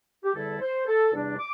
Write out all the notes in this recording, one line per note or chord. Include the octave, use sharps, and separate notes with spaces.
G4
E2 D3 G3 E4 A4
C5
A4
E2 C3 G3 D4
D6